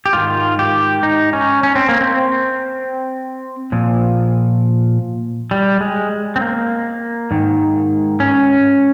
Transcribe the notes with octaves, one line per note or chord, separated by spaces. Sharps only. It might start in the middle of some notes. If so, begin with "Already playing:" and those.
G4
G#2 D#3 F4
G4
D#4
C#4
C#4
C4
A#3
C4
A#2 F3
G3
G#3
C4
A#3
G#2 D#3
C#4